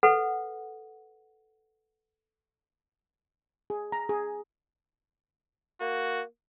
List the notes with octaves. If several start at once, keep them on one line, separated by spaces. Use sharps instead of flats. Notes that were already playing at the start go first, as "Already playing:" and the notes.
A4 B4 F#5
G#4
A#5
G#4
A#3 F#4